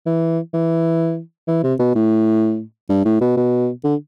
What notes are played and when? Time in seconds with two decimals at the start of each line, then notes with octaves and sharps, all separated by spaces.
0.06 E3
0.54 E3
1.48 E3
1.63 C3
1.79 B2
1.95 A2
2.89 G2
3.05 A2
3.21 B2
3.37 B2
3.84 D3